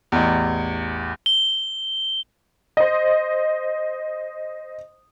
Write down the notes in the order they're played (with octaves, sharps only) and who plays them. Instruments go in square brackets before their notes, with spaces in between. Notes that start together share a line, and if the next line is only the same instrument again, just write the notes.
[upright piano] A1 E2
[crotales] G7
[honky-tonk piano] C5 D#5